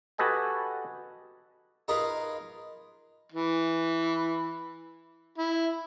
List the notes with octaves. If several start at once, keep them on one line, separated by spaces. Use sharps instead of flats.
F#4 G4 A4 B4 D#5 G#5
D#4 F4 G#4 A#4 B4 D#5
E3
E4